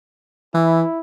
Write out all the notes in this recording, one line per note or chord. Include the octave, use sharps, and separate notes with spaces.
E3 E4